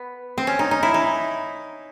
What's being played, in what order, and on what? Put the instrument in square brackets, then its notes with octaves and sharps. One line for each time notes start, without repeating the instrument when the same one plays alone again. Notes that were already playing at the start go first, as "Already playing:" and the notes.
Already playing: [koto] B3
C4
C#4
D#4
D#4
E4
D#4